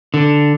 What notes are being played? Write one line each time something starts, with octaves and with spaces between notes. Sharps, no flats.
D3